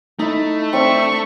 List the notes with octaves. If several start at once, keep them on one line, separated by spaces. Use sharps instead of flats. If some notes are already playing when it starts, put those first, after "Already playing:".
A3 D#4 E4 A#5
C4 D4 E5 C#6 D#6